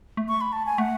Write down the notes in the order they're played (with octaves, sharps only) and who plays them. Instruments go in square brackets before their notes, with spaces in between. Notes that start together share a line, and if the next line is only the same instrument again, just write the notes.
[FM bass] A3
[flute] C#6
B5
A5
G#5
[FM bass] A3 [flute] F#5